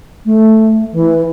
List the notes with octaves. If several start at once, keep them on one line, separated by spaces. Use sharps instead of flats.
A3
E3